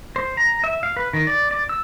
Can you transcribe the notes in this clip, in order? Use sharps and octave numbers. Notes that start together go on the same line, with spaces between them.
C5
A#5
E5
F5
B4
D#3
D5
D5
E6